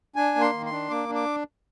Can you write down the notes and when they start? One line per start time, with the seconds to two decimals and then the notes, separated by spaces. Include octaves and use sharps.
0.16 D4 G#5
0.35 A#3
0.41 C6
0.53 D#3
0.66 C6
0.72 D4
0.90 A#3 D6
1.09 D4
1.15 D6